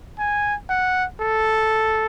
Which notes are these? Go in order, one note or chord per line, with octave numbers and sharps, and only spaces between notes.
G#5
F#5
A4